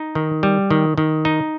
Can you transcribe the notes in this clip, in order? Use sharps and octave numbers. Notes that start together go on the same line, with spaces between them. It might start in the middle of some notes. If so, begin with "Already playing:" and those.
Already playing: D#4
D#3
G3
D#3
D#3
D#4